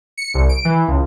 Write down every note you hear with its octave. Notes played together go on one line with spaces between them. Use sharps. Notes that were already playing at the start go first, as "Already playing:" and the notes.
C#7
C2
D7
E3
C#2